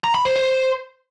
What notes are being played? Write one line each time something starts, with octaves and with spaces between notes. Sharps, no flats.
A#5
B5
C5
C5